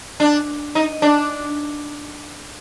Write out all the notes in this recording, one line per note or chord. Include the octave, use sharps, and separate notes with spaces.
D4
D#4
D4